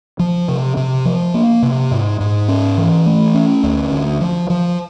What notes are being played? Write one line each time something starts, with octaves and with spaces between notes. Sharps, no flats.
F3
C3
C3
F3
A#3
C3
G#2
G#2
C#4
E3
A3
C#4
D2
D2
F3
F3